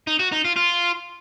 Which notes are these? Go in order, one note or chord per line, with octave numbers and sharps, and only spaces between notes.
D#4
F#4
D#4
F4
F4